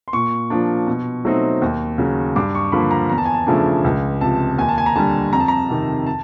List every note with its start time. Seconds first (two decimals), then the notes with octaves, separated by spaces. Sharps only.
0.08 C6
0.13 A#2 C#6
0.50 F3 A#3 D4
0.87 B2
1.25 F#3 A3 C4 D#4
1.62 D#2
1.98 C#3 F#3
2.36 G2 D6
2.55 C#6
2.72 D3 F3 A#3 B5
2.91 A#5
3.09 E2 A#5
3.18 A5
3.26 G#5
3.34 A5
3.47 C#3 F3 A3 D4
3.84 C#2
4.21 C3 F3 A5
4.58 D#2 G#5
4.69 A5
4.78 G#5
4.86 A#5
4.96 D3 G3 A5
5.33 F2 A#5
5.40 A5
5.48 A#5
5.70 C3 D#3
6.06 A5